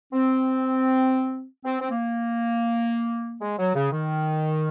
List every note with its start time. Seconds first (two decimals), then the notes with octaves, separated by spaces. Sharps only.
0.13 C4
1.65 C4
1.81 C4
1.90 A#3
3.41 G#3
3.58 F#3
3.75 C#3
3.91 D#3